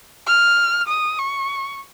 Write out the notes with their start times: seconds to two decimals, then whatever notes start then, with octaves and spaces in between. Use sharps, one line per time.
0.27 F6
0.89 D#6
1.18 C#6